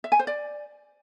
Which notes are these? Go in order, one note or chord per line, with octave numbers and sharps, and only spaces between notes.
E5
G#5
C5
D5